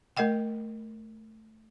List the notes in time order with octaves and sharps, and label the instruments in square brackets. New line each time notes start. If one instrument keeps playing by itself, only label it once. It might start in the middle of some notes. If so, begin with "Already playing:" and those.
[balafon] A3 A#4 D#5 F#5 G5